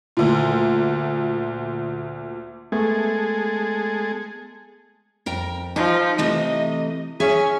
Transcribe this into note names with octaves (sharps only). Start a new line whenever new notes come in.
D2 A#2
G#3 A3 B3 G#4 A4
F2 A#4 G5
F3 D#4
C3 E3 A3 D#5
C#4 G#4 E5 G#5